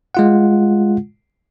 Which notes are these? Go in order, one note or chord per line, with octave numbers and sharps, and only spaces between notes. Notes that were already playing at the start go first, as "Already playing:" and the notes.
G#3 F4 F#5